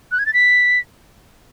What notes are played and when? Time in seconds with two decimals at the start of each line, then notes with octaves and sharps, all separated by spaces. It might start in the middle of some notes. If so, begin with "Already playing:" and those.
0.12 F#6
0.19 G#6
0.26 A6
0.34 B6